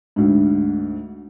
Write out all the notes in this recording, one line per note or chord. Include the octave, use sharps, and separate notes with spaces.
D2 G#2